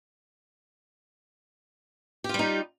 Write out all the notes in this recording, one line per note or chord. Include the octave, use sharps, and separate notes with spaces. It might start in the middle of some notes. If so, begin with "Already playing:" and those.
G3 D#4 F4 G4